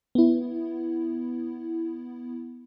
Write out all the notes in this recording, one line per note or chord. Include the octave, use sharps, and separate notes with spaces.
B3 E4